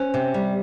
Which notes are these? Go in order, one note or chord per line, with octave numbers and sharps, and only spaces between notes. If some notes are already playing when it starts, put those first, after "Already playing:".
Already playing: C#4 C5
C3
G3